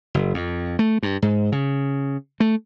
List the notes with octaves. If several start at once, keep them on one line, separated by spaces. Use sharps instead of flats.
F#1
F2
A3
G2
G#2
C#3
A3